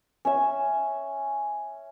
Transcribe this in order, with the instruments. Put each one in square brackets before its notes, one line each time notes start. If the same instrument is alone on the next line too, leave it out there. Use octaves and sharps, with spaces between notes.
[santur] C#4 E5